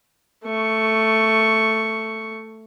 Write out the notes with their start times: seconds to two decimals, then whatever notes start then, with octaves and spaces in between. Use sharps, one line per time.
0.45 A3 C#6